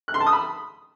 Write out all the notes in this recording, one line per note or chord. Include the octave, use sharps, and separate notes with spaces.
F#6
C6
A5
D#6
B5